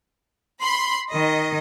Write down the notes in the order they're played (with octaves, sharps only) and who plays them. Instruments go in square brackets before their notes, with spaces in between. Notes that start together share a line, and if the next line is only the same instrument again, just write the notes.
[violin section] B5 C6
[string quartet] D#3 [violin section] D#5